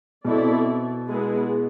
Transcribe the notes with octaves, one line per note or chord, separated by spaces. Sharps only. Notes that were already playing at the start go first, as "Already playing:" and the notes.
B2 C4 E4 A4 D5
G#3 B3 E4 G#4